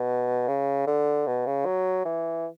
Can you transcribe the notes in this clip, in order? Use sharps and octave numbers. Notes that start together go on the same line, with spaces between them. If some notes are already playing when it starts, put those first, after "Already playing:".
Already playing: B2
C#3
D3
B2
C#3
F#3
E3